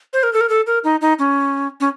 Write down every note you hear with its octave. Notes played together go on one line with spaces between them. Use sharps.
C5
A#4
A4
A#4
A4
A#4
D#4
D#4
C#4
C#4